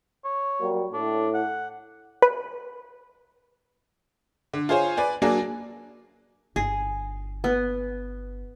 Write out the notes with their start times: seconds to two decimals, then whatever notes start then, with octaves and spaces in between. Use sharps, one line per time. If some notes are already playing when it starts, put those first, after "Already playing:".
0.24 C#5
0.60 F#3 G3 A#3
0.93 A2 D4
1.34 F#5
2.22 B4
4.53 D3
4.69 F4 G#4 C5 C#5 G#5
4.97 B4 D5 G#5
5.22 F#3 A#3 D4 G#4
6.56 G1 G#4
7.44 B3